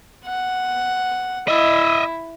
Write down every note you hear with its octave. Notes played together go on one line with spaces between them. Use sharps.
F#5
E4 D#5 E5